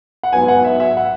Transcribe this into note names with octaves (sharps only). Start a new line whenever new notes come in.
F#5
G#2 F#3 B3 G#5
F#5
E5
E5
F#5